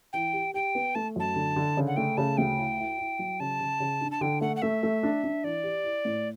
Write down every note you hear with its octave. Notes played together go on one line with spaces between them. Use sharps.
E3 G5
G4
G4 G5
B3
A3 A5
F#2 A5
D3
D3
C#3
F#5
A3 G5
C#3 A5
D2 G5
E4
E4
E4
F#3
C#3 A5
C#3
C#3
D4
A5
D3 G5
A3 F#5
F#5
A3 E5
A3
D4
D4
E3 D5
G4
E4
A2